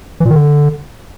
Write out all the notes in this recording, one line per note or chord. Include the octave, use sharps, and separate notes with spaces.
E3
A#2
D#3
D3